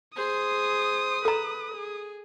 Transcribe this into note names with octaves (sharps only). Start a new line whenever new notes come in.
G#4 C5 D#6
A4 B4 A#5
G#4